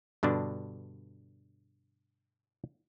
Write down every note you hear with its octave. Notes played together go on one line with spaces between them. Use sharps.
G2 B2 D3 D4